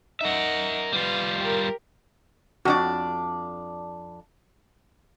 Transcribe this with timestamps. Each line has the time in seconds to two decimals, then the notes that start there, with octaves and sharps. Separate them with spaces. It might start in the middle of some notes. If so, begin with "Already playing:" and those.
0.21 D#4 A#4 E5 F#5
0.92 G3 F4 B4 F5
1.38 G4 A#4
2.65 F2 D4 F#4 D5